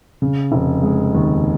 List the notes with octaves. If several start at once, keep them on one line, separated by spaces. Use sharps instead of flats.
C#3
F1
G#3
D#2